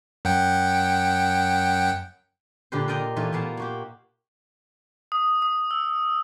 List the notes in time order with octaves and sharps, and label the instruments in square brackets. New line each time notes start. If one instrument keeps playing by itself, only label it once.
[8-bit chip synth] F#2 F#5 G5
[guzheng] A#2 D3 G4 B4 C5
A#4 D5 D#5 G5 A#5
A#2 E3 A3 D#4 F4
A#2 A#3 B3 F5 A5
A#3 F#4 G4
[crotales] D#6
D#6
E6